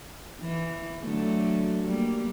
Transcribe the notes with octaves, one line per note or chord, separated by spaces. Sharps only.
E3
D3 F#3 A3
G3 A#3